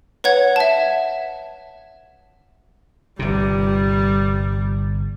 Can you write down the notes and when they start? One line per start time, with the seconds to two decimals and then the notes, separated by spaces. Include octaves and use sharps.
0.24 B4 C#5 F#5 G#6
0.56 E5 A5
3.19 G1 C3 G3